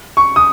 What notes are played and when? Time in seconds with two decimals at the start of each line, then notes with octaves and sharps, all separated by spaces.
0.17 C#6
0.36 D#6